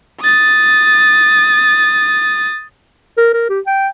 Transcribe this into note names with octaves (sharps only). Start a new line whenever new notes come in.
D#6 A6
A#4
A#4
G4
G5